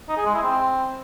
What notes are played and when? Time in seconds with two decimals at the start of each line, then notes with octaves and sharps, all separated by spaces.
0.08 D#4
0.17 G#4
0.26 G#3
0.34 E4
0.43 C4